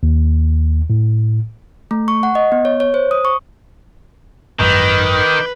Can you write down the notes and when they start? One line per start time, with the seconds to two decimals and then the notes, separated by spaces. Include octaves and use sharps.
0.03 D#2
0.90 A2
1.91 A3
2.08 C#6
2.23 F#5
2.35 D#5
2.52 B3
2.65 C#5
2.80 C#5
2.94 C5
3.11 D#6
3.25 C#6
4.60 G#1 F#2 D#3 B4 D6 G6